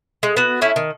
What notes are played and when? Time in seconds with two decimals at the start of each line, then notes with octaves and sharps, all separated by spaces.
0.23 G#3
0.37 B3 F#4
0.61 A3 C#4 E4
0.76 D#3